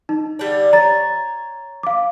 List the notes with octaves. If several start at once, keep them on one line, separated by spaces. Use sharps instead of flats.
D#4
D3 G3 D4
C#5 A#5 A6
F5 D6